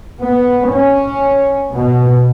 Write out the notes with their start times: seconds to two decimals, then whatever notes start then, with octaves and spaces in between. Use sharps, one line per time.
0.21 B3
0.70 C#4
1.72 B2